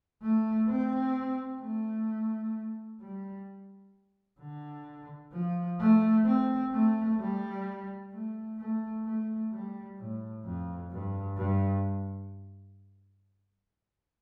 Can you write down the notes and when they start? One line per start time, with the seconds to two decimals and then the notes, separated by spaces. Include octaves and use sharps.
0.22 A3
0.68 C4
1.61 A3
3.01 G3
4.40 D3
5.33 F3
5.79 A3
6.26 C4
6.73 A3
7.19 G3
8.12 A3
8.58 A3
9.05 A3
9.51 G3
9.97 A2
10.44 F2
10.91 G2
11.37 G2